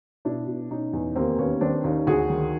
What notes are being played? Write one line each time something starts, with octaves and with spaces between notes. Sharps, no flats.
B2 D4 E4
B2
B2 C#4 D#4
E2
D#2 A#3 C4
D#2 B3 C#4
D#3 C4 D4
D#2 C#4 D#4
D2 F#4 G#4
D#3